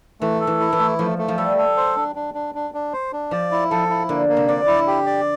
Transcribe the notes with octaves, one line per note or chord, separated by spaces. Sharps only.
E3 A3
A4
E3
E4
E3
A3
F3 A3
A3
F3
G3 A4
A4
C5
D4
D4
D4
D4
D4
C5
D4
F3 D5
E4
F3 A4
E4
D3 A#3
A#3
C3
D3 D5
E4
G4
D5